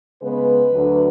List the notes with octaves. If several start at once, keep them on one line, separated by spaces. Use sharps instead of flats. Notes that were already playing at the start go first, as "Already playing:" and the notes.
C#3 G#3 B3 B4
D2 D3 F#3